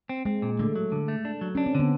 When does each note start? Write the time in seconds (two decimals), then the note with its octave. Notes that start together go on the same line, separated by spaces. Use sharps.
0.09 C4
0.25 G#3 C4
0.42 A#2
0.59 D3 A3
0.76 F#3
0.92 D3
1.08 A3
1.25 D4
1.41 F#3
1.55 C#4 D4
1.66 C4
1.75 D3 B3